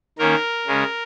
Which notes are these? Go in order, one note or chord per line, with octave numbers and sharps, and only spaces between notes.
D#3 A#3 C#4 A#4
C#3 G#3 C#4